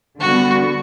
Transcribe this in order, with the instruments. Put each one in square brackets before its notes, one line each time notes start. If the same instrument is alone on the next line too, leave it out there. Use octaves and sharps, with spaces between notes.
[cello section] D3 G3 B3 [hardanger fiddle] F#4